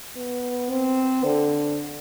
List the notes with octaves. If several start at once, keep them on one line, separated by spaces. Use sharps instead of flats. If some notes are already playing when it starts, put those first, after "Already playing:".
B3
C4
D3